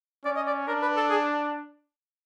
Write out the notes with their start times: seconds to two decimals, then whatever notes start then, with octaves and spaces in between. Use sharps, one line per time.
0.24 C#4 D5
0.36 D#5
0.47 D5
0.67 D4 A#4
0.82 B4
0.96 A4
1.10 G#4